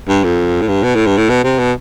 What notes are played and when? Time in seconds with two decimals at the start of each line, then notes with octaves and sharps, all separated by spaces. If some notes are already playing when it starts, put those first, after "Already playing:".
0.09 G2
0.24 F2
0.62 A2
0.68 G2
0.83 B2
0.95 A2
1.06 G2
1.17 A2
1.29 B2
1.44 C3
1.59 B2